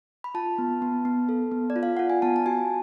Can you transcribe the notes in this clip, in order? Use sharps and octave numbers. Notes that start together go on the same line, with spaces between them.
B5
F4 A5
B3
B3
B3
A4
B3
D5
F4
F5
F4 F#5
G#5
B3 A5
A5
F#4 G#5